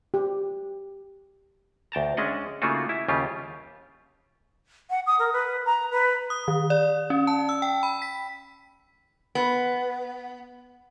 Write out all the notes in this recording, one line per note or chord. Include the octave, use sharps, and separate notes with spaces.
G4
D2 G5 A5 A#5
G#3 C#4 D4 D#5 F#5
C#3 A3 A#3 D#4 F4 F#4
E4
D#2 C#3 G3 F4 G4
F#5
D#6
A#4
B4
A#5
B4
D#6
D#3
D5
C#4
A5
E6
G5
B5
B6
B3